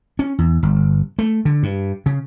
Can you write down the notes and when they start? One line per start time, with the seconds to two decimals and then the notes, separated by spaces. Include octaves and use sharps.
0.19 C#4
0.39 E2
0.63 G1
1.19 A3
1.45 D3
1.63 G2
2.06 C#3